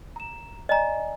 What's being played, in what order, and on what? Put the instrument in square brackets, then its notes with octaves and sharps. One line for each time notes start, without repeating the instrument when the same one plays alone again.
[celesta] A#5 E7
[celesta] D5 G#5 [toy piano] D#5 A#5